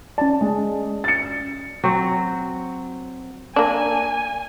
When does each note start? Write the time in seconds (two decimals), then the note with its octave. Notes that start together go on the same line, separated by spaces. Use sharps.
0.18 C#4 D5 A5
0.41 G#3
1.04 A6 C#7
1.84 F#3 C4
3.56 A#3 D4 G#5